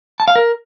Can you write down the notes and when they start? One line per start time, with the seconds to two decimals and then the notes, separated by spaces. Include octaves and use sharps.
0.20 A5
0.28 F5
0.36 A#4